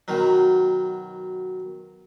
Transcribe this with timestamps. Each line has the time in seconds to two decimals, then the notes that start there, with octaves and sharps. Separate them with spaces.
0.08 B2 D#3 F#3